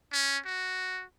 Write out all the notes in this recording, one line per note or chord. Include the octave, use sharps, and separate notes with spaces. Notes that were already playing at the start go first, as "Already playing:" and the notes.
C#4
F#4